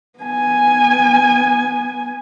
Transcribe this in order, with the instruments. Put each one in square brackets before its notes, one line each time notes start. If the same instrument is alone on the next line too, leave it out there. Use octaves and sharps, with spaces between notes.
[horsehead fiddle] B3 G#5